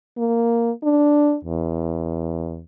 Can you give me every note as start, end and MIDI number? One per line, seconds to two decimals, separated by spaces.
0.18 0.71 58
0.83 1.36 62
1.45 2.63 40